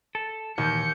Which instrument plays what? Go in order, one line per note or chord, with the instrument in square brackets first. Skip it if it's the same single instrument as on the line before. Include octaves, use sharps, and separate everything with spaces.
[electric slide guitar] A4
[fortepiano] D#2 [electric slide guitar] A#2 E3 [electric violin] G6 C#7